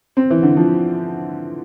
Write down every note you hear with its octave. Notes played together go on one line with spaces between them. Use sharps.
C4
E3
D3
F3